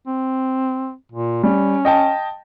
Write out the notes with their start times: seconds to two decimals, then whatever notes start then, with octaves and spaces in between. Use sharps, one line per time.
0.07 C4
1.12 A#2
1.43 G3 C#4
1.85 D#5 G5 A5